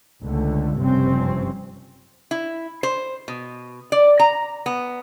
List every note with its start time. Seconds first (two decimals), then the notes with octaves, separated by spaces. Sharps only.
0.22 C#2 D3 A3
0.77 F#1 G2 C3 F3 C4 C#4
2.31 E4
2.83 C5
3.28 B2
3.92 D5
4.19 A#5
4.66 B3